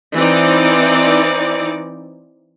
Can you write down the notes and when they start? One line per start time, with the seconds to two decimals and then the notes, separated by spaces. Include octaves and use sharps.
0.15 E3 C4 D#4 D5